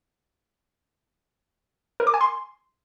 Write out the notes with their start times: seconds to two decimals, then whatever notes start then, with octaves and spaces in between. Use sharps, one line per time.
2.00 A#4
2.07 D6
2.14 G#5
2.21 C6